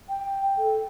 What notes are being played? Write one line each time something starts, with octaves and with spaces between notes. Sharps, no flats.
G5
A4